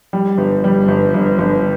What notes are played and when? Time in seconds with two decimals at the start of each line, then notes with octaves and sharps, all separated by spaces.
0.13 G3
0.38 G1
0.64 G3
0.88 G1
1.14 G1
1.39 G1